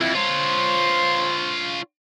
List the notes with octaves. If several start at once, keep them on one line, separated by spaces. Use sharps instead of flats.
F2 E4
F4 C5 C#5